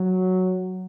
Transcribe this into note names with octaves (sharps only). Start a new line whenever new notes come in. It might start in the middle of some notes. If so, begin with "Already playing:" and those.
Already playing: F#3